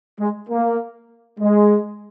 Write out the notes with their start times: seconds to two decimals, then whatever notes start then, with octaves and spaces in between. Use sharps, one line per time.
0.19 G#3
0.49 A#3
1.39 G#3